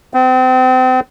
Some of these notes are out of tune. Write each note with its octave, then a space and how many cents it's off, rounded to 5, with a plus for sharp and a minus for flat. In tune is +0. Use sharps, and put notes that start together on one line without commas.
C4 -35